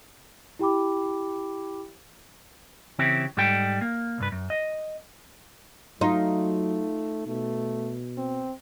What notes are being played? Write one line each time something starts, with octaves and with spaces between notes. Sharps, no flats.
E4 G4 G5 B5 D6
C#3 E3 C4 E4 G4
G#2 G3 A4 G5
A#3
C2 G2 B4
F#2
D#5
F#3 A3 D#4 F4
B2 A3
C4